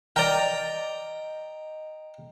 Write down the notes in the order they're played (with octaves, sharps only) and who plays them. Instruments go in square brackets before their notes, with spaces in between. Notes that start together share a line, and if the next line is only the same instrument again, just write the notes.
[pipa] A#4 D5 [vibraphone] D#5 [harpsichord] G5 A#5